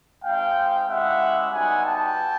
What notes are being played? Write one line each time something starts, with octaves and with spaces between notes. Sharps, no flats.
G#3 C4 D#4 F5 G5
G#3 C#4 E4 G4 E5 F#5
G3 B3 D#4 F#4 F#5 G#5
G5 A5